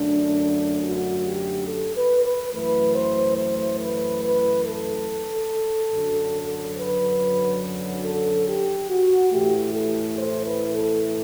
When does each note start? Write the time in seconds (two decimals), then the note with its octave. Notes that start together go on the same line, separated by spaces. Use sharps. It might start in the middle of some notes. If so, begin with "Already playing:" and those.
Already playing: F#2 D3 A3 D4
0.83 F#4
1.25 G4
1.68 A4
1.96 B4
2.24 B4
2.52 F#2 E3 A3 B4
2.95 C5
3.38 C5
3.80 B4
4.23 B4
4.65 A4
5.92 F#2 D3 F#3
6.77 B4
8.05 A4
8.47 G4
8.89 F#4
9.32 A2 E3 A3 G4
9.74 A4
10.17 C5
10.45 B4
10.74 A4